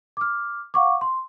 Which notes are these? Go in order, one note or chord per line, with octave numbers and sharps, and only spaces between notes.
D6 F6
F5 F#5 C#6 D6
C6